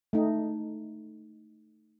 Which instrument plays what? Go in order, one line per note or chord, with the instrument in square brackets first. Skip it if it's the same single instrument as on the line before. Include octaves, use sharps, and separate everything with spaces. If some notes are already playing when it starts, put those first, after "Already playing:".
[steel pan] A3 D#4